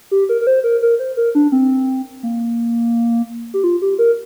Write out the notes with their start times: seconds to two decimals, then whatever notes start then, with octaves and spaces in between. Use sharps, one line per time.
0.11 G4
0.29 A#4
0.41 A#4
0.47 C5
0.64 A#4
0.82 A#4
0.99 C5
1.17 A#4
1.35 D4
1.52 C4
2.23 A#3
3.54 G4
3.64 F4
3.82 G4
3.99 A#4